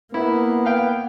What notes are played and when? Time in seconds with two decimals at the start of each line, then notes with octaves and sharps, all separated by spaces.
0.14 A#3 B3 E4
0.65 B4 F5 G5